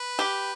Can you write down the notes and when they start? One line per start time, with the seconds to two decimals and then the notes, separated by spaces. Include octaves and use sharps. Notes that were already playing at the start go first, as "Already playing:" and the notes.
Already playing: B4
0.19 G4